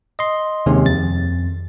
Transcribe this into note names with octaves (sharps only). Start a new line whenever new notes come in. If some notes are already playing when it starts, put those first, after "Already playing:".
D#5 C6
D#2 C3 D#3 G#3 C#4
F2 A6